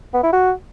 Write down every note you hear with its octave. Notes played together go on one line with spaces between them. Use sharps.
B3
E4
F#4